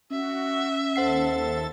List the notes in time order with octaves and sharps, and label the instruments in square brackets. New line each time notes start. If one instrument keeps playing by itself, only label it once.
[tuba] C#4 [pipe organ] F#4 [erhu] E5
[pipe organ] D#2 A4 A6 [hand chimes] C5 F#5 C7